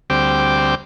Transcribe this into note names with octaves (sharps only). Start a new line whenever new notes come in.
D2 G3 C4 G5 D6